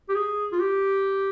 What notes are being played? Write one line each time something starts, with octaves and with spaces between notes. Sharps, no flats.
G4
G#4
F4
G4